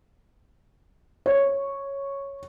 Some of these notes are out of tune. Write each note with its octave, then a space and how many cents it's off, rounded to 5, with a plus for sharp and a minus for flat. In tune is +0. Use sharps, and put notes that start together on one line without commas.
C#5 -5